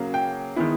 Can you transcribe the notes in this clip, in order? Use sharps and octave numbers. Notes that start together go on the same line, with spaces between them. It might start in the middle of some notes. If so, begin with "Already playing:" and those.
Already playing: C#3 F#3 A#3
G5
D#3 G#3 B3 E4